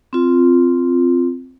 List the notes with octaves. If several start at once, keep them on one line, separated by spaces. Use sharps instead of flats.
C4 F4